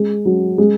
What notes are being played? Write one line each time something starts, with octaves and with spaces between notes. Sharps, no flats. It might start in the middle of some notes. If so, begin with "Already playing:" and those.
Already playing: G#3
F#3
G#3